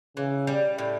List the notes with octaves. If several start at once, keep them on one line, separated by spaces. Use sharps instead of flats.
C#3 E3
G3
A2